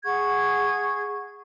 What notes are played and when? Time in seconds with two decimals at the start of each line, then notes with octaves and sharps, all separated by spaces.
0.04 G#4 F#5 C#6 G#6